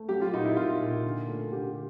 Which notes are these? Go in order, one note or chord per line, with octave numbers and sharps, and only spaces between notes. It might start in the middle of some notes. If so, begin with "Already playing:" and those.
Already playing: A3
F#3 G4
F4
A#2 D#4
E4
A#2 F4
A#2
D3
A3
D3 G4